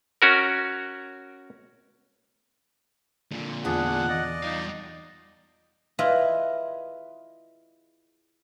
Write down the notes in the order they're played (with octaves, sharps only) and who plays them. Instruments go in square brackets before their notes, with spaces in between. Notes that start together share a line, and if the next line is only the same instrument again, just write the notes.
[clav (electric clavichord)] C#4 F#4 A#4
[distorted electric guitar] A#2 D3
[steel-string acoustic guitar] E2 F4 [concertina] D4 G#4 [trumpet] F#5
[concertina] D5 D#5
[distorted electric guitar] G3 F5 [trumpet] D#4
[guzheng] E4 F4 G#4 B4 D#5